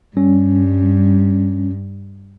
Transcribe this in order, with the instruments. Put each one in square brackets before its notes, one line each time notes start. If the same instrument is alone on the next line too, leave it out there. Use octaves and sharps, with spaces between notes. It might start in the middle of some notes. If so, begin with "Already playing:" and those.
[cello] G2 [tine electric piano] G3 C#4